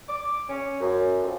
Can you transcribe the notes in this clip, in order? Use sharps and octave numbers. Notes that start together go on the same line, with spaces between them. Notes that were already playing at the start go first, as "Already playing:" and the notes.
D6
C#4
F#2
F2